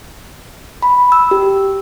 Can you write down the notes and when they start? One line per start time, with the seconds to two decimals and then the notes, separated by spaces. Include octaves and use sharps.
0.83 B5
1.12 E6
1.31 G4